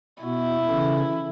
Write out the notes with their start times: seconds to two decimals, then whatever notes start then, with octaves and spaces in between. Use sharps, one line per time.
0.22 B2 B3 E4 F#4
0.66 C#3 E3 C#4 A4